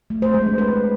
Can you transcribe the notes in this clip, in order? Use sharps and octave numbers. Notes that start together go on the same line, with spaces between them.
A3
C5
G#3
D4
B4